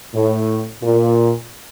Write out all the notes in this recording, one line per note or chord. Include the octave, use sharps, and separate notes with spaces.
A2
A#2